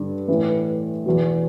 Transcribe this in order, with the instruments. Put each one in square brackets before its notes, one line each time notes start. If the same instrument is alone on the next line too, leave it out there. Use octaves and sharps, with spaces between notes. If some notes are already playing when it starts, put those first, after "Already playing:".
Already playing: [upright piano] G2 D3
A2 E3 B4
E2 B2